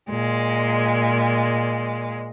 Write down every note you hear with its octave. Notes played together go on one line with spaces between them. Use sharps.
A#2 G#3